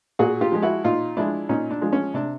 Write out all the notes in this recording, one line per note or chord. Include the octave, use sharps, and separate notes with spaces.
A#2 F#4 G#4
F4 G4
F3 G#3
E4 F#4
A#2 D#4 F4
F3 G#3 D4 E4
A#2 C#4 D#4
D4
F3 G#3
C#4
C3 D4